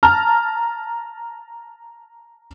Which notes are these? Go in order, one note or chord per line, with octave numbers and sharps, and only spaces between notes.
A5 A#5 F6